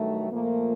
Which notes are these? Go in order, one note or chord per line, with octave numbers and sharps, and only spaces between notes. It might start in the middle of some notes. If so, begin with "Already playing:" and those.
Already playing: G2 D#3 F#3 A3
A#2 F3 A3 A#3